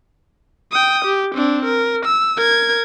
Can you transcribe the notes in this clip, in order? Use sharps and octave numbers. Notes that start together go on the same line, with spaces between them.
G5 D#6
G4
C4 D4
A#4
E6
A#4 G#6